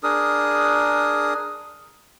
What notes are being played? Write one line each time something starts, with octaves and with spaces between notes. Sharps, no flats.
D4 G#4 A#4 D#6